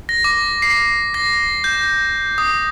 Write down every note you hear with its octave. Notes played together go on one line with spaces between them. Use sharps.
A#6
D6
C7
A#6
G6
D#6